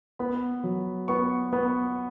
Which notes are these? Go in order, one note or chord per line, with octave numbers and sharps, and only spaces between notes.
B3 B5
F#3
B3 C#6
B3